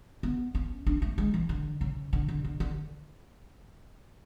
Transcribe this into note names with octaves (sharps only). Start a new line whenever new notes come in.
B3
C#4
D4
A3
G#3
E3
D3
C#3
D3
D3
D3
D3